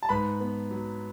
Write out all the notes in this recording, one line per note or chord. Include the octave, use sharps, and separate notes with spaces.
A5
G#2 B4 B5
B3
F#3